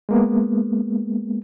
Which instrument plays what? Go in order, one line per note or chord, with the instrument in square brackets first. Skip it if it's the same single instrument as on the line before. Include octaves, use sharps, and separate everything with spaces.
[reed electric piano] G#3 A#3 B3